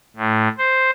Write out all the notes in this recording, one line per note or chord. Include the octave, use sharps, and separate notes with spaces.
A2
C5